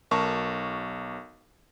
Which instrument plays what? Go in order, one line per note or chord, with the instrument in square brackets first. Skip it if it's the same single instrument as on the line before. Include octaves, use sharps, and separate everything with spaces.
[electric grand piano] B1 A#4 A5 C#6